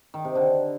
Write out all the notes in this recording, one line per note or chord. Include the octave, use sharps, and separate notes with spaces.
D#3
C3
D3